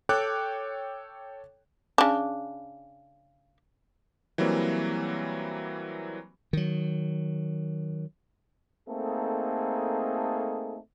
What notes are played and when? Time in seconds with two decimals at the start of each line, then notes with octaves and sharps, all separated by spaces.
0.09 A4 C#5 G5 D6 F#6
1.98 C#3 D4
4.38 E3 F#3 G3 A#3 C4
6.53 D#3 F#3
8.87 A3 A#3 C4 D#4 G#4 A4